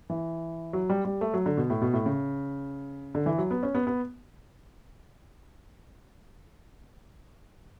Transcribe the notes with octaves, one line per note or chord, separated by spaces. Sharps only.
E3
F#3
G3
G3
A3
F#3
D3
B2
A2
B2
A2
C#3
D3
E3
F#3
B3
C#4
B3
B3